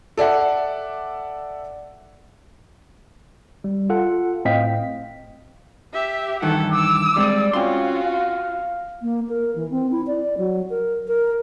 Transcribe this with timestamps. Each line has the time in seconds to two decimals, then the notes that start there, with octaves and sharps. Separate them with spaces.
0.17 A4 D5 E5 F#5
3.64 G3
3.90 F4 A4 F#5
4.45 A2 C4 D#5 F5 G5 B6
5.93 G4 E5
6.42 G2 D#3 E3 A4 F#5
6.72 D6 E6
7.16 G3 G#3 C4 D5
7.53 C4 C#4 F4 F#4 C6
8.03 F5
9.02 A#3
9.29 A#4
9.55 E3
9.70 C4
9.91 E4
10.07 D5
10.37 F#3
10.70 A#4
11.08 A#4